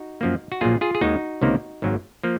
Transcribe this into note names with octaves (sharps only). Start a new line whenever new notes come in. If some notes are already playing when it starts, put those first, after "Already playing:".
Already playing: D#4 F#4
F#2 F3 A#3
F#4
A#1 A#2 F#3 A#3 F4 G#4
F4 G#4
G#4
D#2 D#3 G#3 D#4 F#4
C#2 C3 D#3 A#3
G#1 G#2 F#3 A#3
F3 A#3